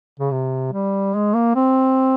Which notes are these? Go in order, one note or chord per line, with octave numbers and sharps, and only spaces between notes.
C#3
C3
G3
G#3
A#3
C4